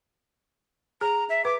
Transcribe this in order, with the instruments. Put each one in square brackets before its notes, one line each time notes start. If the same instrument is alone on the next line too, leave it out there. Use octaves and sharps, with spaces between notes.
[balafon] G#4 [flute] A#5
[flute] E5
[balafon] B4 [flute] D6